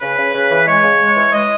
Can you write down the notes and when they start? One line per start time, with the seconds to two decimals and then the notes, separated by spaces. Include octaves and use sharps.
0.01 C#3 B4
0.18 C#3
0.34 C#3
0.50 E3
0.66 G#3 C#5
0.84 C#3
1.00 G#3
1.16 E3
1.32 G#3 D#5